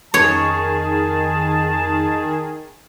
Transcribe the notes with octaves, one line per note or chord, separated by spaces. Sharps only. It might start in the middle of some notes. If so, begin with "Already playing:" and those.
F2 D#3 G#4 C#5 A5